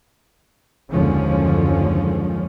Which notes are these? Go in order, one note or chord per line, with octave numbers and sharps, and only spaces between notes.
F#1 D#2 D3 F3 G#3 C#4